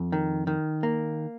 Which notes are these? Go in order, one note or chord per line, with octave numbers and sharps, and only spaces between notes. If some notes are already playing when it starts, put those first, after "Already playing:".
Already playing: F2
D#3
D#3
A#3